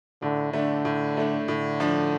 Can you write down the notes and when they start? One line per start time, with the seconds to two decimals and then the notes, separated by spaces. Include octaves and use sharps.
0.22 A2 D3
0.53 D3 A3 D4
0.85 A2
1.17 A3 D4
1.48 A2 D3
1.80 F3 D4